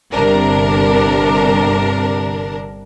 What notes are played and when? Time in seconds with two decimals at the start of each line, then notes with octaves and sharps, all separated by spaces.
0.11 G1 C3 D4 A#4